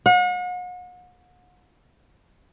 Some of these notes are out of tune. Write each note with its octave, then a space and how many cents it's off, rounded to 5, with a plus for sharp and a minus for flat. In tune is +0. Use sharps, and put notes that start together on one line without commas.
F#5 -40